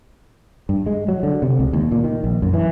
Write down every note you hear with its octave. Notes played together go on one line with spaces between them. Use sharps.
G2
G#3
F#3
D3
C3
C#2
D#2
A#2
D#3
A#1
F#2
E3